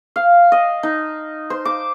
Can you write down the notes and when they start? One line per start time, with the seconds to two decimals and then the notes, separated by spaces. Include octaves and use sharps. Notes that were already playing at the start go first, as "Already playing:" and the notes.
0.16 F5
0.52 D#5
0.83 D#4
1.50 C5
1.65 D6